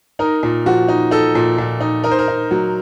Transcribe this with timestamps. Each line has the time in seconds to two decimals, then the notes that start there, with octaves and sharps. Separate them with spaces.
0.19 D#4 A#4
0.43 A#2
0.66 F3 F#4
0.88 D#4
1.11 D#4 A4
1.35 A#2
1.58 A#2
1.81 D#4
2.04 D#4 A#4
2.11 C5
2.19 A#4
2.28 D#4
2.51 F#3